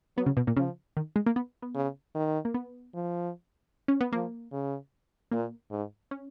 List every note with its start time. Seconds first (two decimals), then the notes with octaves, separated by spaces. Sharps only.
0.16 F#3 B3
0.26 C#3
0.37 B2
0.47 A#2
0.57 C#3 F3
0.97 D#3
1.16 G#3
1.26 A#3
1.36 B3
1.62 B3
1.75 C#3
2.15 D#3
2.45 A#3
2.54 B3
2.94 F3
3.88 C#4
4.01 B3
4.12 F3 A#3
4.52 C#3
5.31 A#2 A#3
5.71 G#2
6.11 C#4